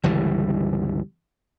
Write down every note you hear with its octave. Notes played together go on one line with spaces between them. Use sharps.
G1 C#2 E3 G3